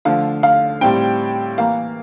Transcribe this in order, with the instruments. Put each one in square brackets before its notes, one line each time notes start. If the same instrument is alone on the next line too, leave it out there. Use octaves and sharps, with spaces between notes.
[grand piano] D3 F3 A3 F5
F5
A2 G3 C4 G5
E3 A#3 F5